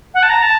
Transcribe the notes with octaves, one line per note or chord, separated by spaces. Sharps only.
F#5
A5
A#5
A5